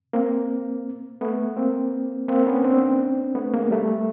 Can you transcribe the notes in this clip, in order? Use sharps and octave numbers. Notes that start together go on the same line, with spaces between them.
A#3 C4
A3 B3
A#3 C4
A#3 C4
B3 C#4
C4 D4
A3 B3
G#3 A#3
G3 A3